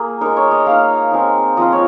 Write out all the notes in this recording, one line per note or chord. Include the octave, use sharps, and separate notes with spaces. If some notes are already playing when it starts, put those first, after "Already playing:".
Already playing: A#3 G#4
G#3 D#4 A#4
C#5
D#5
A#3 D#4 F5
G#3 C4 D#4
F3 C4 F4 D#5
C#5